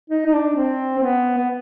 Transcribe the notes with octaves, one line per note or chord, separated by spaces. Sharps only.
D#4
D#4
D4
C4
C4
B3
B3